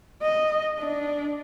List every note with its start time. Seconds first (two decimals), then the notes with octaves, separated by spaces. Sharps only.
0.22 D#5
0.79 D4